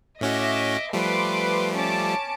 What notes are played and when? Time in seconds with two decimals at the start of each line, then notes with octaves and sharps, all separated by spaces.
0.21 A2 C#4 F#4 D#5 E5 D6
0.93 F3 G3 A3 B4 C6 D6
1.75 C#4 A5 D6